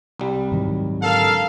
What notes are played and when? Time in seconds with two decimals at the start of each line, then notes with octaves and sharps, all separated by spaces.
0.19 C2 G3
0.52 G#2 D#3 F#3
1.03 D3 A4 A#4 F5